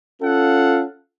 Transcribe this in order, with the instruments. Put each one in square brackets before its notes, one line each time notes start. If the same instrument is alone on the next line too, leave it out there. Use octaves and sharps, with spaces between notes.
[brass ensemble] C#4 F4 A4 F5 F#5